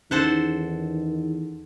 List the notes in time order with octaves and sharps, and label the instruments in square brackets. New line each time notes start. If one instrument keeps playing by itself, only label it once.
[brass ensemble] E2 [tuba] D#3 [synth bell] C#4 D#4 [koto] A4 C5 F#5